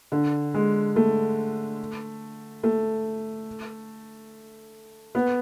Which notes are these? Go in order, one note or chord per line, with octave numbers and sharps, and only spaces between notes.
D3
G#3
A3
A3
B3